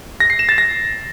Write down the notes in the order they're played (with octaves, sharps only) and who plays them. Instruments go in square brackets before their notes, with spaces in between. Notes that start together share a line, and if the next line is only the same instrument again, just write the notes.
[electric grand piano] A#6
C7
E7
A6
A#6